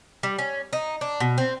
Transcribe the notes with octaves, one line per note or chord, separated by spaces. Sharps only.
G3
C#4
D#4
D4
B2
C4